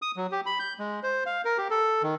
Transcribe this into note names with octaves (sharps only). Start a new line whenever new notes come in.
D#6
F#3
G4
B5
G6
G#3
C5
F5
A#4
G4
A4
D#3